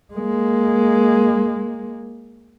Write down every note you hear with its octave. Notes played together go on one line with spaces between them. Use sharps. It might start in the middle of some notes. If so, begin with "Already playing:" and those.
G#3 A#3